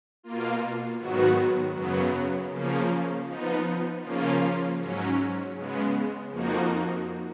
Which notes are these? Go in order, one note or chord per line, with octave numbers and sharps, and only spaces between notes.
B2 A#3 F4
G#2 D#3 F#3 B3 F#4
F#2 C#3 F#3 B3
C#3 F3 A#3 C#4
F3 B3 D#4
C#3 F3 A#3 C#4 F4
G#2 F#3 C#4
C#3 G#3 B3
F2 F3 A#3 D#4 F#4